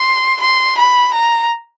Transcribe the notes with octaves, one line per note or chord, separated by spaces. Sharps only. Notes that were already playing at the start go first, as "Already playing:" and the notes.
Already playing: C6
C6
B5
A#5